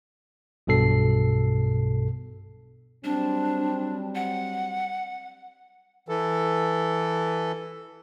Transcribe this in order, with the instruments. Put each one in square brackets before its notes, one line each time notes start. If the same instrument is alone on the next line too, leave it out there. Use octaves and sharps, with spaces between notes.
[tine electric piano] B1 G2 B2 A4 C7
[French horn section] F#3 G3 C4 [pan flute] D4
[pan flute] F#5
[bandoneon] E3 A4